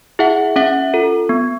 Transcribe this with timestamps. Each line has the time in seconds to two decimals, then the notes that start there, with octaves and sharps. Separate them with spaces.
0.19 E4 G#4 E5 F#5
0.56 C#4 E5 F#5
0.94 F4 A4
1.29 B3